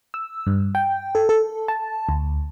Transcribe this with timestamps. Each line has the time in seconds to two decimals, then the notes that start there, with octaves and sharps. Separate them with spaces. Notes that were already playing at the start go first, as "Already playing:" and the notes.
0.14 E6
0.47 G2
0.75 G5
1.15 A4
1.29 A4
1.68 A5
2.09 D2